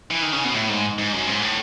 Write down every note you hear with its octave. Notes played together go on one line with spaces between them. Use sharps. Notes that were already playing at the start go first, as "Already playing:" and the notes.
E3
D#3
C#3
B2
A2
G#2
G#2
F#2
G#2
A2